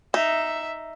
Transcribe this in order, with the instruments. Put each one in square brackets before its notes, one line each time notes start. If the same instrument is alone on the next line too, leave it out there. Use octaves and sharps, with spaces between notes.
[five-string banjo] D#4 [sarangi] E5